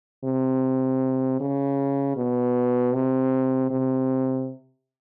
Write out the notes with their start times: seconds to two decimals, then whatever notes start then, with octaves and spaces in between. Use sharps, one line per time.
0.24 C3
1.41 C#3
2.17 B2
2.94 C3
3.71 C3